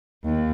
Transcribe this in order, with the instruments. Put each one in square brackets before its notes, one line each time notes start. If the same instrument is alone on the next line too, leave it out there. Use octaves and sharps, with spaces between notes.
[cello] D#2